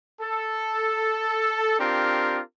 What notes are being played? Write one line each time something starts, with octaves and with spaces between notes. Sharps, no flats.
A4
C4 D4 F4 G4 A#4